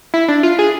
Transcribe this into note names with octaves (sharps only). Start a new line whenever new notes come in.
E4
D4
F4
G#4